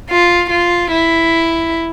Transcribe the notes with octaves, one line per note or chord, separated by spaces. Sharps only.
F4
F4
E4